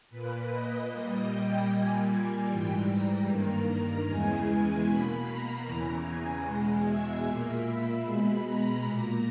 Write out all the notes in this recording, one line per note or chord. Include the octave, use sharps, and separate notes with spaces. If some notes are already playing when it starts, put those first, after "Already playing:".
A#2 A#3 B4
D#5
A#2 G3 A#3
G5
A#2 G3 A#3 G#5
G#2 E3 G3 G5
A#5
G2 D#3 A#3 A#5
E2 C#3 E3 G#3 G#5
G#5
B2 A#3 B5
A#5
E2 C#3 E3
G#5
E2 B2 G#3
E5
A#2 A#3
B5
B2 G#3
A#5
A#2 A#3